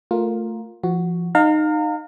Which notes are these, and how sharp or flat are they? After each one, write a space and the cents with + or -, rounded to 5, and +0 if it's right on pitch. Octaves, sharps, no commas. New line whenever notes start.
A3 +15 F4 +15 A#4 +0
F3 -25 F#4 +0
D#4 -15 F5 +20 A#5 -35